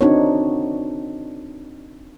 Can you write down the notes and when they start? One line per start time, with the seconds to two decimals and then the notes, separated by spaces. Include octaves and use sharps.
0.01 C4 D4 D#4 F#4 A#4 C#5